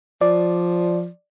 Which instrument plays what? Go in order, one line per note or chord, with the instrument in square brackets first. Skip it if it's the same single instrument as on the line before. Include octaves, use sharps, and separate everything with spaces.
[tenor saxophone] F3 [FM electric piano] D5